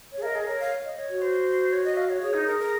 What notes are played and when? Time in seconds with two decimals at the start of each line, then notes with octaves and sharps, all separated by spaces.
0.12 C#5
0.17 G#4
0.22 A#4 F5
0.26 D#5
0.35 G#4
0.47 A#4 C#5
0.60 F5
0.85 D#5
0.96 C#5
1.10 F#4
1.22 C5
1.72 C#5
1.84 D#5
1.97 F5
2.09 C#5
2.21 G#4 C#5
2.34 D#4
2.47 A#4
2.59 A#4